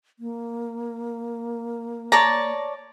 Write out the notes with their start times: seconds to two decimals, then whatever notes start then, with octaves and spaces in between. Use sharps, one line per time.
0.19 A#3
2.12 C#5 D5 A5 A#5